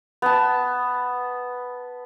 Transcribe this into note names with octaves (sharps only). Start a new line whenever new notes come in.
B3 A5